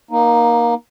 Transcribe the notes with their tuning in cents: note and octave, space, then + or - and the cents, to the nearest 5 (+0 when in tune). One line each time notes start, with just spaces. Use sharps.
A#3 +25 D#4 +0